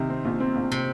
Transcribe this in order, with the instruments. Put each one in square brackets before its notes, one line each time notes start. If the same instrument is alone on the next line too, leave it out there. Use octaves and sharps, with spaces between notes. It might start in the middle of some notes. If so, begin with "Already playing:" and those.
Already playing: [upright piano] C3 [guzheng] D#3
[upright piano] C4
A#1
C4
A#1
[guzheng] C3